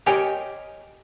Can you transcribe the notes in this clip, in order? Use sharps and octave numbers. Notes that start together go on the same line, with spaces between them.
G4 A#4 C#5 D#5 G5 G#5